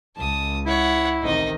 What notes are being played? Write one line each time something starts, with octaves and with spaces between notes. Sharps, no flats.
C#2 A5 D#6
E4 C#5 F#5
A1 C3 D#3 D#4 D#5